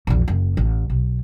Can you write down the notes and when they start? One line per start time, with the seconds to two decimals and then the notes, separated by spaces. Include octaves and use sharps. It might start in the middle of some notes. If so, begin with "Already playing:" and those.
0.07 A#1 E2
0.28 F#1
0.57 A1
0.90 B1